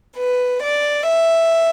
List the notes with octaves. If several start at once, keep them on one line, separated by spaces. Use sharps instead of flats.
B4
D5
E5